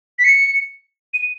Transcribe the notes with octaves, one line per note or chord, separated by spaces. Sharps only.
B6
C#7
D#7